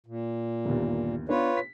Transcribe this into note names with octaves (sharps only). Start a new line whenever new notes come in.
A#2
G1 D#2
B3 D4 F4 B4 C#5
B6